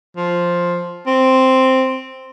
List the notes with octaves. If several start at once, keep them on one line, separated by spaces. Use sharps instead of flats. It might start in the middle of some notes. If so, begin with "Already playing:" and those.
F3
C4